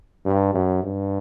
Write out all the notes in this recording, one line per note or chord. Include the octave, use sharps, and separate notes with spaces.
G2
F#2
G2